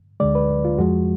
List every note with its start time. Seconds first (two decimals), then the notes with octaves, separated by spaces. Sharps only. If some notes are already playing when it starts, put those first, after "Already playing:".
0.20 D2 D3 G#3 D5
0.35 B4
0.65 F4
0.78 F2 F3 G#3 F#4